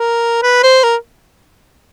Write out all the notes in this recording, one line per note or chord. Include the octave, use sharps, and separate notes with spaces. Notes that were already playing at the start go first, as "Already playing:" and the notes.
Already playing: A#4
B4
C5
A#4